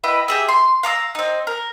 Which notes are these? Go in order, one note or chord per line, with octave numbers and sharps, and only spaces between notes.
E4 B4 D#5 G5
G4 G#4 E5
C6
F5 A#5 D6 E6
C4 D#4
A#4